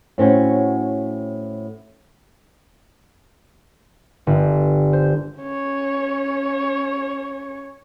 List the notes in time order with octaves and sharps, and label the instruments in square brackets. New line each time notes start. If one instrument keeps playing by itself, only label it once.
[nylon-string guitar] A2 C4 C#4 F#4
[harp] G1
C5
[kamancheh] C#4 C#5